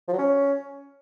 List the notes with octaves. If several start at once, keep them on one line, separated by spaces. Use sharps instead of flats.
F3
F#3
C#4